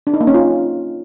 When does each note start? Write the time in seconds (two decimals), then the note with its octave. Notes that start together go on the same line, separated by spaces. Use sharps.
0.07 D4
0.14 D#4
0.21 A#3
0.27 C#4
0.34 F4